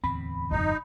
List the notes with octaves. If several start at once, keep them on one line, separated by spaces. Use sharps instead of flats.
D1 E2 C4 B5
F#1 F#2 D#4